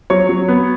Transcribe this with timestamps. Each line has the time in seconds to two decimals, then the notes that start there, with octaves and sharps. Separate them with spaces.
0.10 F#3 C#5 C#6
0.29 F#3
0.48 B3